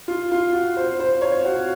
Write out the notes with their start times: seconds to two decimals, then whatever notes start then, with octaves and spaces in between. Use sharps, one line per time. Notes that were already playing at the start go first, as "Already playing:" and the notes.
0.08 F4
0.32 F4
0.53 F#4
0.77 C5
1.00 C5
1.22 C#5
1.45 F#4